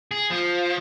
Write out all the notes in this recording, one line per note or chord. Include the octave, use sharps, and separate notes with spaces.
G#4
F3